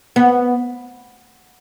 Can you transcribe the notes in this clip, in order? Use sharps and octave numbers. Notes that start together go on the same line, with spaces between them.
B3